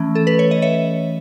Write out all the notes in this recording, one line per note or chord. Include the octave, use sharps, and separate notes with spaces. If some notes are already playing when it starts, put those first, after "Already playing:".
Already playing: E3 A3 C#4
A4
B4
C#5
D#5
C#5 E5